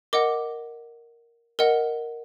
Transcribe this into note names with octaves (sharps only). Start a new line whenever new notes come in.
A#4 D#5 F#5 D6
A#4 D#5 F#5